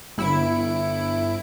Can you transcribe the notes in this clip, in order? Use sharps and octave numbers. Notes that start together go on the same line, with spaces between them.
G1 E4 C#7 D7